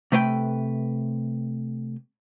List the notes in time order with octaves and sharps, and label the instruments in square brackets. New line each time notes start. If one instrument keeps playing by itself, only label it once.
[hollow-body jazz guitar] C3 A3 B4 C5 G5